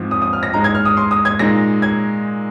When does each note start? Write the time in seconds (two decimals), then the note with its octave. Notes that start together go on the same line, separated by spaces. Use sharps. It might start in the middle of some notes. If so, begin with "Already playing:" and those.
Already playing: G#2 F3 C4 F4
0.11 D#6
0.22 D#6
0.33 F6
0.43 A#6
0.53 G#2 G#3 D#4 A#5
0.64 G#6
0.75 F6
0.85 D#6
0.97 C6
1.11 D#6
1.25 G#6
1.39 A#2 G#3 D#4 A#6
1.82 G#6